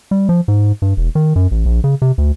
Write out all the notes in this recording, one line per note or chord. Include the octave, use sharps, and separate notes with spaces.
G3
F3
G#2
G2
E1
D#3
F#2
A1
A#1
C#3
C3
D2